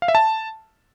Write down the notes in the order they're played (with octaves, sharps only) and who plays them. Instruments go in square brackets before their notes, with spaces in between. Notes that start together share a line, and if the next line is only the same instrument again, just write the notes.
[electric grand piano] F5
E5
A5